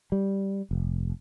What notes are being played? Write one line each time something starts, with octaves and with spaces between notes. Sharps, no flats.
G3
F1